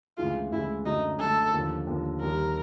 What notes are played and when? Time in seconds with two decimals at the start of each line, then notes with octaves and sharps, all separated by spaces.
0.17 D2 C#3 E3 G#3 F4
0.51 D2 C#3 E3 G#3 E4
0.85 F#2 D3 F#3 A3 D#4
1.19 F#2 D3 F#3 A3 A4
1.53 D#2 D3 F3 A#3
1.87 D#2 D3 F3 A#3
2.20 D#2 D#3 G3 A#4